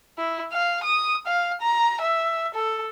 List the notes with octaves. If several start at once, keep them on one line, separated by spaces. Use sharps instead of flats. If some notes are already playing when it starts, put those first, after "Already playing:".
E4
F5
D#6
F5
A#5
E5
A4